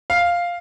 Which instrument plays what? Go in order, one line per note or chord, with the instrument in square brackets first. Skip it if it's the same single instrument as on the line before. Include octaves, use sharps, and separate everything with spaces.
[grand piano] F5